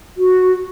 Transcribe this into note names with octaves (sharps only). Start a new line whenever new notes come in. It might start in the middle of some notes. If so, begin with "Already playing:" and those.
F#4